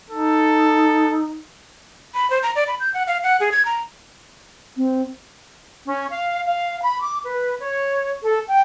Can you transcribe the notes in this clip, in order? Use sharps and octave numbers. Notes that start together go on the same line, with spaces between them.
D#4 A4
B5
C5
A#5
D5
B5
G6
F#5
F5
F#5
G#4
G#6
A#5
C4
C#4
F5
F5
B5
D6
B4
C#5
A4
G5